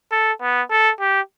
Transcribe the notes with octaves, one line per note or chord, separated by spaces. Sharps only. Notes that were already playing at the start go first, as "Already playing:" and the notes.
A4
B3
A4
G4